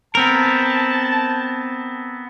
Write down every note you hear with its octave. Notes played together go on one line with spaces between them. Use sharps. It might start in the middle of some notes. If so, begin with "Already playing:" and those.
B3 C4 A#4 A5